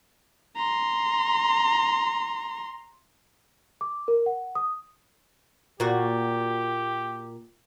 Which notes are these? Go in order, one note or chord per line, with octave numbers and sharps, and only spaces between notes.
A#5 C6
D6
A#4
F#5
D#6
A#2 F#4 G4